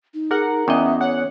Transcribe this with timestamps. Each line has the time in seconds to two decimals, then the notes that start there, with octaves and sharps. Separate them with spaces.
0.14 D#4
0.31 G#4 A#4 F#5
0.68 E2 C#4 D#5 E5
1.01 C#5 F#5